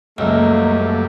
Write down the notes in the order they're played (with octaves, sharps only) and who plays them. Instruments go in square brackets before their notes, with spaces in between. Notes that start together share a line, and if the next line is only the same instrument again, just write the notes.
[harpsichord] C#2 [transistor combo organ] F#2 G3 [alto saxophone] A3 [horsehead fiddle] A#3